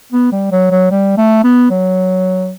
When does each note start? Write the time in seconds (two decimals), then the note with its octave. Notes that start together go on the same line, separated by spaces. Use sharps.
0.12 B3
0.32 G3
0.52 F#3
0.71 F#3
0.91 G3
1.18 A3
1.44 B3
1.70 F#3